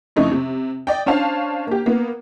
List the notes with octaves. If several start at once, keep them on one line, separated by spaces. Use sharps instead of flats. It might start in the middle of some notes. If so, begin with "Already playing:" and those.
F2 C#3 A3 D#4 E4
C3
D5 D#5 G5
C#4 D4 C5 F5 A5
A#3 G4
A#3 B3